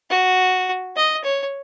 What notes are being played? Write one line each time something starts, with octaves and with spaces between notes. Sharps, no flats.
F#4
D#5
C#5